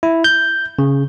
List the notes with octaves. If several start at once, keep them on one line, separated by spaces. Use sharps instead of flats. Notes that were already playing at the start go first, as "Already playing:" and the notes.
E4
G6
C#3